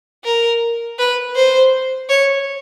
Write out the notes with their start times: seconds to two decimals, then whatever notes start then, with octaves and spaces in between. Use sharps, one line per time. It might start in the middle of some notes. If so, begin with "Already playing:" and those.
0.24 A#4
0.98 B4
1.36 C5
2.09 C#5